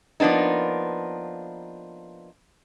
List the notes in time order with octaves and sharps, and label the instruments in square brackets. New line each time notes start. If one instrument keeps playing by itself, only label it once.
[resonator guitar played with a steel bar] F3 A#3 B3 D4 D#4